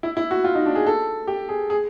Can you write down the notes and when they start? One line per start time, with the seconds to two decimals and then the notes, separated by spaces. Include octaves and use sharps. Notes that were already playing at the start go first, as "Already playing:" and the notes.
0.03 E4
0.17 E4
0.31 F#4
0.44 F4
0.55 D#4
0.66 D4
0.75 G#4
0.87 A4
1.27 G4
1.49 G#4
1.70 G#4